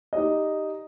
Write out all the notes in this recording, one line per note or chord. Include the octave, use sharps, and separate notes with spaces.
D#4 G4 D5 D#5